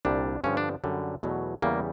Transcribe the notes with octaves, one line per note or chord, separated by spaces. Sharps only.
C2 A#2 G3 D4
G2 D3 F3 C#4
D4
F#2 D3 G3
E2 B2 F#3 A3
E2 C#3 E3 G3 A#3